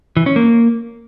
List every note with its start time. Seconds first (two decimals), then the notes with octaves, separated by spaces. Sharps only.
0.17 E3
0.26 C#4
0.36 A#3